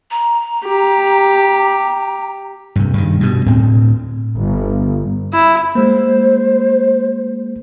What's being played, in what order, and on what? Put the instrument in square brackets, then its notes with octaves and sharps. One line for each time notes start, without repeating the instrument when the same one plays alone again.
[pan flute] A#5
[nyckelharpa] G4
[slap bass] G2 C3
G2 D#3
G2 B2
D2 A2 C4
[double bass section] G1
[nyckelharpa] E4
[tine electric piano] G#3 A#3 [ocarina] C5